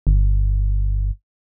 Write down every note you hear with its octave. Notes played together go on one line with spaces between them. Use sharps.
G1